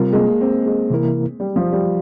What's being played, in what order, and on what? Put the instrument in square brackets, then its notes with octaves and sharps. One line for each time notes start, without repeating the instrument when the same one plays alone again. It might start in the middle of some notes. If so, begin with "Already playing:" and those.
Already playing: [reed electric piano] C3 G3 C4 F4 A#4
[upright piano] G#3
A#3
C4
G#3
[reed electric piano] C3 E3 A#3 E4 A#4
[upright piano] G3
F3
G3